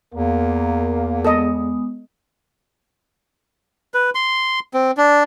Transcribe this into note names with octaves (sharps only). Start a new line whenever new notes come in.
E2 A#3
G#3 B3 A4 D#5 D#6
B4
C6
C4
D4